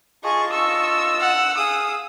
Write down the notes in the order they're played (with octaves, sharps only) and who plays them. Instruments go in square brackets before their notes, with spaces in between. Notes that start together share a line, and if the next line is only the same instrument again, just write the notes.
[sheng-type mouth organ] F4 D#5 A5 [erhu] G#4 [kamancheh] C#6
[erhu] C#6 [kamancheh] E6
[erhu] F#5
[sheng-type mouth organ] G#4 F5 [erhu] D#6